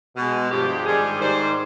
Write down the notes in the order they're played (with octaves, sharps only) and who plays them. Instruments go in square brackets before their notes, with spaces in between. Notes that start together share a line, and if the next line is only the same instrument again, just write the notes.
[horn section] B2 G#3
G2 F3 G#3 G4
G#2 D#3 G3 G#4
G#2 D#3 G3 C5